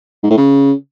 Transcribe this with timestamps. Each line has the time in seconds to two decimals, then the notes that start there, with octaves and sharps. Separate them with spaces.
0.23 G#2
0.30 A2
0.37 C#3